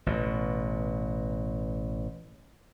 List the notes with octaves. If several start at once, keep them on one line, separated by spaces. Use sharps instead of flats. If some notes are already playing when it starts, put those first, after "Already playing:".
A1 B2